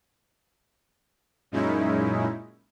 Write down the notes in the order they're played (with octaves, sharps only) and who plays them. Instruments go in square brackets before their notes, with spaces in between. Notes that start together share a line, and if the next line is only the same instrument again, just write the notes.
[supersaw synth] F#2 A#2 G#3 C#4 D#4 E4